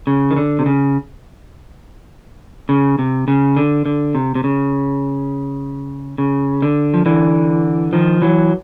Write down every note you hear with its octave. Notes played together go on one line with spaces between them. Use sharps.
C#3
D#3
D3
C3
C#3
C#3
C3
C#3
D3
D3
C3
C3
C#3
C#3
D3
F3
D3 E3
D#3 F3
E3 F#3